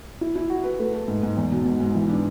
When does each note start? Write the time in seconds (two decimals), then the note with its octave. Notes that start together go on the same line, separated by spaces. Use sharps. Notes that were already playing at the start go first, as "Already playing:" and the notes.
0.21 E4
0.36 E4
0.50 F#4
0.64 B4
0.79 A3
0.94 A4
1.08 G#2
1.23 G#2
1.37 E2
1.51 B2
1.65 G#2
1.80 G#2
1.95 E3
2.09 D4